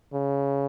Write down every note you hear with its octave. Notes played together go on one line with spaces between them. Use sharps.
C#3